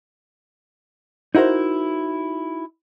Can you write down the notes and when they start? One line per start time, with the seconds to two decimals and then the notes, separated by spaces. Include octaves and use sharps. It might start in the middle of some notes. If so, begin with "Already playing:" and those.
1.35 D#4 E4 F#4 A#4 C5